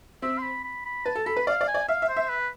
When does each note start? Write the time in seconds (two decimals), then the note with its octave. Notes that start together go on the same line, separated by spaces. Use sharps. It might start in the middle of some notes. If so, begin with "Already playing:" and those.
0.22 C4 E5
0.38 C6
0.43 B5
0.64 B5
0.85 B5
1.05 B4 A5
1.15 A4
1.26 A4 B5
1.36 B4
1.47 D5 F5
1.61 D5
1.68 G#5
1.74 D5
1.88 E5 F5
2.02 E5
2.09 C5
2.17 E5
2.29 B4